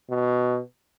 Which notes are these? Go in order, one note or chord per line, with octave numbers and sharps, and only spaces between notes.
B2